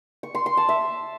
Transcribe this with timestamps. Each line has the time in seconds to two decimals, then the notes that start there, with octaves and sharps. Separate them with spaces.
0.23 C#6
0.35 C6
0.46 C6
0.57 A5
0.69 E5